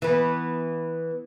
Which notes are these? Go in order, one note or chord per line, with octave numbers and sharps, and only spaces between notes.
E3 B3